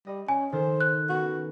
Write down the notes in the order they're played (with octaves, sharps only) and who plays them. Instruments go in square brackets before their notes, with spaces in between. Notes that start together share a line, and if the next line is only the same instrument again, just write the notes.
[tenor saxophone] G3 [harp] D#5
[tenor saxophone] C#4 [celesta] G#5
[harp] D#3 A4 F6 [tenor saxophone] C5
[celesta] F#6
[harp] B3 C#4 [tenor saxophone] F#4